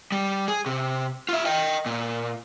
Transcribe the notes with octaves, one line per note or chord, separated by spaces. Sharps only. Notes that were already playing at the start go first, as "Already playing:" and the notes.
G3
G#4
C3
F4 E5
D#5 G5
A#2